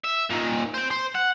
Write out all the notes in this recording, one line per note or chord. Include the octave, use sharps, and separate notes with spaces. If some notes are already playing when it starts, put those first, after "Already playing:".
E5
A#2 D#3
C5 G5
C5
F#5